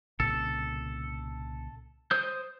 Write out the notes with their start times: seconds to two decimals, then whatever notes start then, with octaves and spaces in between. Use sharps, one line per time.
0.20 C2 A#2 C#3 A4
2.11 C5 D#6 G6